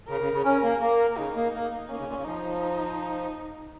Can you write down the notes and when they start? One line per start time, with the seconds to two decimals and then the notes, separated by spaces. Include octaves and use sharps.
0.08 C#3 A#4
0.21 C#3
0.34 C#3
0.45 C#4 A#4
0.63 A#3
0.81 A#3 A#4
1.17 C#3 D#4
1.36 A#3
1.54 A#3
1.89 A#3 C#4
1.98 C#3
2.08 A#2
2.17 C#3
2.25 F3 D#4